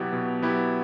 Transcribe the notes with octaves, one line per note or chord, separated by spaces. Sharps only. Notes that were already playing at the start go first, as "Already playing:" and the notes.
Already playing: B2 F#3 B3 E4 G4
B2
F#3 B3 E4 G4